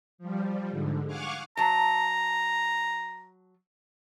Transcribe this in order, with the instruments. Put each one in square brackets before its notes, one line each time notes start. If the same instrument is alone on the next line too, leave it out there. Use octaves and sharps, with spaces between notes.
[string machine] F3 G3
G#2 D3
F5 F#5 G#5 C#6 D6 F6
[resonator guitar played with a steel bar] F#3 A5 [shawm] A#5